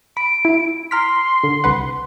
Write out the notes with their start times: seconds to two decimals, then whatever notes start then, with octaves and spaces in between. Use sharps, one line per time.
0.17 B5 D7
0.45 E4
0.91 A#5 C6 F6 B6
1.44 D3
1.64 C2 B4 F#5